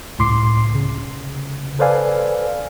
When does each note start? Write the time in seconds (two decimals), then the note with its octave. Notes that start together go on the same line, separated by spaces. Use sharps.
0.19 C#2 A2 C6 D6 C7
0.75 C#3
1.79 A4 B4 C5 D5 F5 G#5